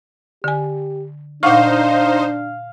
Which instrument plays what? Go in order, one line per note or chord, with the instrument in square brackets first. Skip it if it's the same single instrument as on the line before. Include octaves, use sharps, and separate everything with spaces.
[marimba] D3 G#5 [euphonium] G4
[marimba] A#2 F#5 C#6 [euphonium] D4 [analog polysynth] D#4 C5 [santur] F5